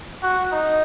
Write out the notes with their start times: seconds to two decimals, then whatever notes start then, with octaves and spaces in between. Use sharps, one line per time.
0.23 F#4
0.52 D#4